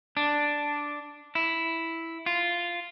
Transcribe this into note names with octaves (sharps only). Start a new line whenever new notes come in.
D4
E4
F4